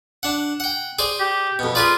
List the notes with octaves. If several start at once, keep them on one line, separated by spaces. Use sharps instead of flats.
D4 F#5
F#5 G5
G#4 C5 D5
G4
F2 B2
F4 G#4 B4 D5